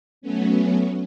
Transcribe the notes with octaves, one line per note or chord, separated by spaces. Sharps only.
F#3 A3 B3 C#4